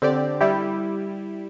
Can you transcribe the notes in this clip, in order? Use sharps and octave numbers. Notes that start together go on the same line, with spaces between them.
D3 C4 G4 D5
G3 E4 G4